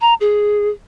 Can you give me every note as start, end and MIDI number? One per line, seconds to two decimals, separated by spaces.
0.01 0.14 82
0.21 0.69 68